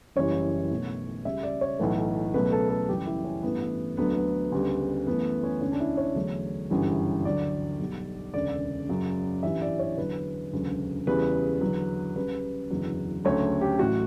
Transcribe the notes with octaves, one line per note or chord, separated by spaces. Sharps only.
F#1 F#2 E3 G3 C#5
B1 B2 A3
C#2 C#3 G3 E5
D5
C#5
B1 A2 E3 A3 B4
C#2 B2 F#3 A3 B4
A4
A4
F#2 C#3 E3 G3 G4
E4
C#4
A1 G2 E3 A3 B3
D2 D3 F#3 A3 B3
B3
D2 C#3 G3
F#2 E3 A3 B3
C#4
E1 D2 D3 C#4
D4
E4
C#5
E2 D3 F#3 A3
G1 F#2 C#3 E3 G3
D2 D3 F#3 D5
B1 B2 G3
E1 D2 C#3 D5
F#2 C#3 F#3
A1 G2 E3 G3 E5
D5
C#5
E2 D3 F#3 B4
E1 D2 C#3 F#3
E2 C#3 G3 B4
E2 D3 F#3
C#2 C#3 G3 B4
F#1 E2 D3 F#3
D2 C#3 F#3 A3 C#5
G4
A1 A2 F#3 A3 F#4